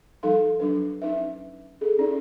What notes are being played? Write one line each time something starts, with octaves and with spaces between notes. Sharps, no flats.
F3 G3 D#4 A4 F5 C6
F#3 D4 B4
C#4 D#4 B4 E5
C#4 G#4 A4
C#4 D#4 E4 D5